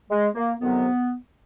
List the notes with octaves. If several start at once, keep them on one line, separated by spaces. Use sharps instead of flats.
G#3
A#3
F2 C3 D#3 F#3 B3